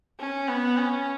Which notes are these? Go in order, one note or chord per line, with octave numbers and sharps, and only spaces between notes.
C#4
B3
C#4